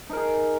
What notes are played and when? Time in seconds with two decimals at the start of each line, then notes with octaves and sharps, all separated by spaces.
0.09 D#4
0.13 A#4
0.16 G#4